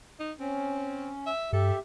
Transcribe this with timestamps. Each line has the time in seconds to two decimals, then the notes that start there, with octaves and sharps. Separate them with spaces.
0.19 D#4
0.40 C4 C#4
1.26 E5
1.53 G2 G4 A4 E5